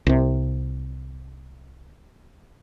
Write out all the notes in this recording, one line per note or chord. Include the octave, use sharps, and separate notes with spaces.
C2 C3